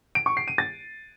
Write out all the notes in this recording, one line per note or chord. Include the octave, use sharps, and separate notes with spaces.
D7
C#6
C7
D#7
A6